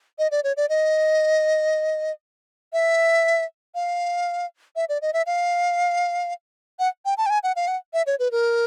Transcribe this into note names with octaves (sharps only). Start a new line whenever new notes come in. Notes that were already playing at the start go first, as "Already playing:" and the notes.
D#5
D5
C#5
D5
D#5
E5
F5
E5
D5
D#5
E5
F5
F#5
G5
A5
G5
G#5
F#5
F5
F#5
E5
C#5
B4
A#4